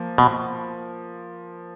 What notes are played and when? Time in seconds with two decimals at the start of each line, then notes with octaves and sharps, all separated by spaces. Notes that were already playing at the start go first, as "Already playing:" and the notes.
Already playing: F3 A#3
0.18 B2